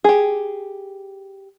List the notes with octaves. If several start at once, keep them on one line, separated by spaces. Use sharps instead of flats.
G4 G#4